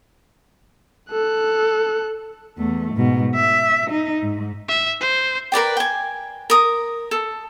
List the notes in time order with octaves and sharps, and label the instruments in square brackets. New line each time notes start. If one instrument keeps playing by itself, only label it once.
[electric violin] A4 F#6
[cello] E2 A3
G#2 B2
E5
D#4
G#2
[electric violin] E5
C5
[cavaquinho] A#4 B4 D5 G5
G5 G#5
A#4 D#6
A4